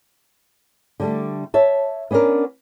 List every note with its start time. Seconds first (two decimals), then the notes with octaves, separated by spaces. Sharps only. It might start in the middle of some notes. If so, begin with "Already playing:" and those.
1.00 D3 G3 A3
1.54 C#5 E5 A5
2.11 B3 C#4 D4 F#4 A#4